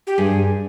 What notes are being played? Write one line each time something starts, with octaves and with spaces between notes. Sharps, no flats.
G4
G2 G#4